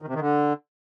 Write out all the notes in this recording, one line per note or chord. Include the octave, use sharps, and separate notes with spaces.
D#3
C3
D#3
D3